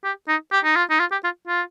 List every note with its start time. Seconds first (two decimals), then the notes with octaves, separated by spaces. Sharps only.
0.04 G4
0.28 D#4
0.52 G4
0.65 D#4
0.76 F4
0.90 D#4
1.00 F4
1.12 G4
1.24 F4
1.47 F4